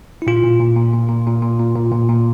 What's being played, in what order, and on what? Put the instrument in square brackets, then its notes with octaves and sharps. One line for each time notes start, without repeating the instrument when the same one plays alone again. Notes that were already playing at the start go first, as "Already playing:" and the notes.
[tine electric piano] E4
A#2 F4
A#2
A#2
A#2
A#2
A#2
A#2
A#2
A#2
A#2
A#2
A#2